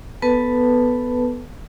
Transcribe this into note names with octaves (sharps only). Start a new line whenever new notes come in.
B3 A4 B4 A5